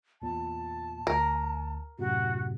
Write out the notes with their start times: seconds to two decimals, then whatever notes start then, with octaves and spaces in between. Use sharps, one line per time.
0.22 E2 A#2 A5
1.07 D2 A#4
1.99 F#2 A2 C3 F#4